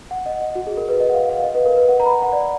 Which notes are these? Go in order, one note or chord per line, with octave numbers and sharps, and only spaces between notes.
F#5
D#5
D#5
F#4
G#4
A#4
B4
D#5
F#5
F5
F5
D#5
B4
A#4
B4
F#5
A#5
B5
A#5
F#5
D5